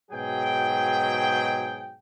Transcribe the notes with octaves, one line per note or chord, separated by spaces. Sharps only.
G#2 B2 F#3 G#4 G5